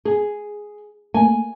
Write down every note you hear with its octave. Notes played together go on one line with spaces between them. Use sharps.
G#4
A3 A#3 G#5